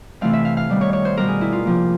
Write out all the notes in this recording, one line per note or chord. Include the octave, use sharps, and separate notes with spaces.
C3 E3 A3 C4 F5
E5
F5
F5
D#3 G3 B3
C#5
C#5
C5
B2 G3 B3 A#4
G#4
E4
F4
C3 F3 A#3